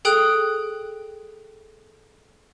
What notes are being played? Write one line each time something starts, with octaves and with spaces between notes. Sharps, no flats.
G#4 A4 G5 D#6 F#6